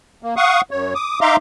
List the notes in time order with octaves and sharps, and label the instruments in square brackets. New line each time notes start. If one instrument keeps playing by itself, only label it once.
[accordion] A#3
F5 F#5 C#6 D#6
F#2 C#5
D6 D#6
D#4 E5 F5 A#5 C6 D6